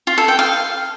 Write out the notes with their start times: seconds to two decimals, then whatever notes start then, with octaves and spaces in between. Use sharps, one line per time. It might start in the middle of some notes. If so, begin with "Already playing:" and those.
0.07 F4
0.18 A4
0.28 G5
0.39 F5